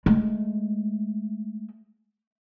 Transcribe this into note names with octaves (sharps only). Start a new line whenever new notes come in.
G#3 A3